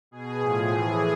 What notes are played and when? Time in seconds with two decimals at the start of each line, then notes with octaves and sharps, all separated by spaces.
0.11 B2 G#4
0.42 A2 F3 G#4
0.72 A2 E3